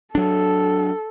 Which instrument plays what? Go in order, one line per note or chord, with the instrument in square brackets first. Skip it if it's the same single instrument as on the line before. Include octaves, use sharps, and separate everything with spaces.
[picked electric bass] F#3 D4 [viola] A4